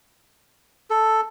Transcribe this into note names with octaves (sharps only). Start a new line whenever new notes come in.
A4